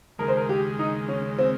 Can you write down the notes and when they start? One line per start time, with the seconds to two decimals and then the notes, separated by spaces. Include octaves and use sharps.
0.19 D#2 C#3 G#3 A#4
0.28 C5
0.37 A#4
0.49 G4
0.79 D#4
1.08 C#4
1.38 C4